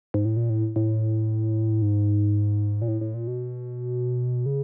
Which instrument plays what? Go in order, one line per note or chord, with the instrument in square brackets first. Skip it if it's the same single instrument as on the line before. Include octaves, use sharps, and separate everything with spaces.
[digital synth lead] G#2
A2
A#2
A2
A2
G#2
A#2
A2
A2
A#2
B2
C#3